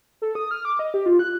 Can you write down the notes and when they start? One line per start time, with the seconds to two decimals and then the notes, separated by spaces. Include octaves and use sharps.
0.22 A4
0.35 D#6
0.51 F6
0.65 D6
0.79 D#5
0.94 G4
1.06 F4
1.19 F#6